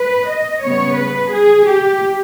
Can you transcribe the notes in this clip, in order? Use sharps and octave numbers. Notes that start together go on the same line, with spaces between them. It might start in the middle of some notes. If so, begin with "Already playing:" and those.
Already playing: B4
D#5
C#3 G3 B3 C#5
B4
G#4
G4